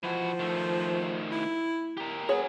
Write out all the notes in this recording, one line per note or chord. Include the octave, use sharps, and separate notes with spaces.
E3 F3 F#4
D#3 A3
E4
G4 A#4
B3 F#4 G#4 C#5 G#5